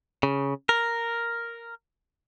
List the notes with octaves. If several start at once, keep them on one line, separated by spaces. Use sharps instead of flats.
C#3
A#4